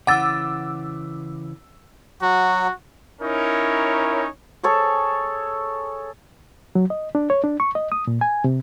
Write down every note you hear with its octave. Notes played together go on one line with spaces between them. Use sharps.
C#3 E3 F#5 D6 E6 A6
F#3 F#4
C#4 D#4 E4 A#4 C#5
G#4 A4 C#5
F#3
D#5
D4
C#5
D4
C#6
D#5
D#6
A#2
G#5
C3